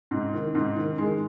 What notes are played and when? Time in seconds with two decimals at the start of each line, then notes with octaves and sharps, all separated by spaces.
0.11 G#2
0.34 D#3
0.55 G#2
0.76 D#3
0.98 D#3 G#3